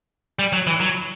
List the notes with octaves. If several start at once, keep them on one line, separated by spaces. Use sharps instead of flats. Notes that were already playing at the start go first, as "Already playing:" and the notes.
G3
F#3
E3
F#3